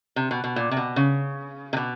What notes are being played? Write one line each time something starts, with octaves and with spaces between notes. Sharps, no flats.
C3
B2
B2
A#2
C3
B2
C#3
C3
B2